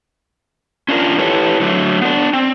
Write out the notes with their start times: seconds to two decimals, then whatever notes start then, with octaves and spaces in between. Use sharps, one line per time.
0.88 C#4 D4 F4 G#4 A#4
1.18 E4 G4 A4 B4 C#5
1.60 D3 F#3 A3
2.01 B3 D4
2.33 C4